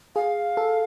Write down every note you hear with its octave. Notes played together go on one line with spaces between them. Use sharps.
G#4 F5
A4